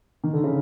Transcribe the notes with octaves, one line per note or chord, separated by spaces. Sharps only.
D#3
D3
C#3